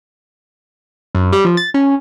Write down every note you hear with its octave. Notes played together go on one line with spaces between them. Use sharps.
F#2
G3
F3
A6
C#4